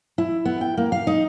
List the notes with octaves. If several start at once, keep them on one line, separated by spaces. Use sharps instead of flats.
E4
B3
G5
A#3
F5
D#4